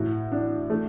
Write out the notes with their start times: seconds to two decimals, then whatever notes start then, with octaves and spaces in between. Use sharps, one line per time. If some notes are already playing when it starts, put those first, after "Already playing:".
Already playing: A2 F#4
0.32 D4
0.70 A3